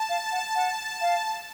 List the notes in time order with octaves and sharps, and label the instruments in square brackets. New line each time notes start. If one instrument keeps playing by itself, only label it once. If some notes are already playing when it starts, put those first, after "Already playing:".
Already playing: [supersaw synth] A5
[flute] F5
F#5
F#5
F5